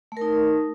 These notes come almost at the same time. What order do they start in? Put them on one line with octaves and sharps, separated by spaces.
A3 A#4 D#4